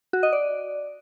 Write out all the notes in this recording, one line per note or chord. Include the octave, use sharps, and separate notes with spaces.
F#4
D#5
D5